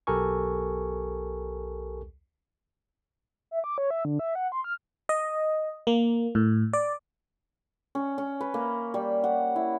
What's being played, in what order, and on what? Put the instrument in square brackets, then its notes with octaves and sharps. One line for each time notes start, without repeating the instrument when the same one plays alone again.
[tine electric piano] B1 G4 A4 A#4 G#5 C#6
[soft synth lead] E5
D6
C#5
E5
D3
E5
F#5
C6
F6
[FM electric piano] D#5
A#3
A2
D5
[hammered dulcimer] C#4
C#4
B4
A#3
G3
F#5
E4